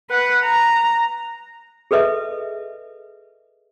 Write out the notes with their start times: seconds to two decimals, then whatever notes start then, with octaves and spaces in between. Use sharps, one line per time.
0.10 B4 F#5
0.44 A#5
1.91 G#4 A4 B4 D#5 E5